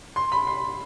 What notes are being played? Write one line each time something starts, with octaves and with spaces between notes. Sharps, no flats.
C6
B5
C6